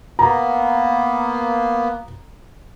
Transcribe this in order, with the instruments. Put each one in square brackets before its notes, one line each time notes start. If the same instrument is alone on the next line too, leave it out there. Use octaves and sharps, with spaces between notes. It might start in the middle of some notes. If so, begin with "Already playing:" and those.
[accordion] A#3 B3 [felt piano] A#5